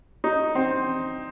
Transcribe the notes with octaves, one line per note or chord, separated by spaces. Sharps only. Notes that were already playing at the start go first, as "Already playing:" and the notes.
D#4
C4